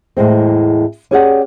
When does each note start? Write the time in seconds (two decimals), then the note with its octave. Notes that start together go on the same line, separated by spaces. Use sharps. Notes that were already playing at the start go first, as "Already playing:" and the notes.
0.17 E2 A2 G#3 C4
1.11 C#4 G4 G#4 D5 F5 F#5